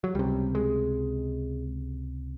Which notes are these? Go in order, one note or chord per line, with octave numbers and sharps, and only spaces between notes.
F#3
C#2 C3 G3
G#3